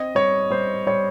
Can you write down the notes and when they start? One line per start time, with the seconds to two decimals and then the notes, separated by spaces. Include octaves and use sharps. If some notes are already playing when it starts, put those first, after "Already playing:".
Already playing: C4 D#5
0.15 G3 C#5
0.50 G3 C5
0.87 G3 C#5